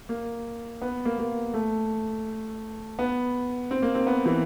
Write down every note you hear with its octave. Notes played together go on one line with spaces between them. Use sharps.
A#3
B3
A#3
A#3
A3
B3
C4
A#3
C4
B3
E3